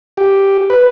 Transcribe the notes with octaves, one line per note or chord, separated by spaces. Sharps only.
G4
B4